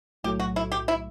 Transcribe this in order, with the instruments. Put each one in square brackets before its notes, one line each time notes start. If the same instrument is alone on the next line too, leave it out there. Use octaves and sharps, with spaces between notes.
[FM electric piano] B1 A2 F#3 A3 [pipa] G4
[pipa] F#4
E4
G4
E4